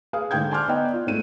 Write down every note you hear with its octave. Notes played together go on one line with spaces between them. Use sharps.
G#4 B4 F5 G#5 D#6
G#2 D3 D4 G5 G6 G#6
G#5 A5 C6 D6 F6 F#6
B3 D#4 D5 D#5 G5
F4
G#2 A3 C4 D#7